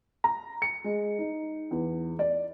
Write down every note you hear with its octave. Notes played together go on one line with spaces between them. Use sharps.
A#5
C#7
G#3
D#4
E2
D5